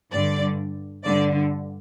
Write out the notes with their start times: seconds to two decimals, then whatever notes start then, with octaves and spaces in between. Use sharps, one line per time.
0.12 G2 D3 D5
1.04 G2 D3 D5